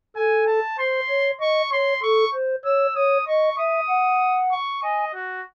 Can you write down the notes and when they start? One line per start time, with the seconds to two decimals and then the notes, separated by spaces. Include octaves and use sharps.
0.16 A4 G#5
0.47 A5
0.78 C5 C6
1.09 C#5
1.40 D#5 C#6
1.72 C#5 C6
2.02 A4 C#6
2.34 C5
2.65 C#5 E6
2.96 C#5 D#6
3.27 D#5 C#6
3.58 E5 D#6
3.89 F#5
4.51 C#6
4.83 D#5 G#5
5.14 F#4